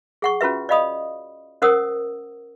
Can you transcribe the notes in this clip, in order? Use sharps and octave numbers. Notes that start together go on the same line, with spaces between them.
G#4 F#5 C#6
C#4 F4 F#4 B4 E5
D5 D#5 F5 B5 D#6
C#4 A#4 C5 F#5 D#6 E6